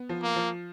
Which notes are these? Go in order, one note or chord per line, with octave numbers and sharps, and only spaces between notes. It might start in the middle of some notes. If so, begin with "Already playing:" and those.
Already playing: B3
F3
A#3
F3